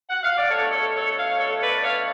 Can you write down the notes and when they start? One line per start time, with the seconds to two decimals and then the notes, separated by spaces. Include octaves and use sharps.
0.09 F#5
0.23 F5
0.37 D5
0.49 B2 A3 D4 A4 C#5
0.72 A4 C#5
0.94 A4 C#5
1.16 C#5 F5
1.38 A4 C#5
1.60 B4 D5
1.76 D5
1.83 C#5 F5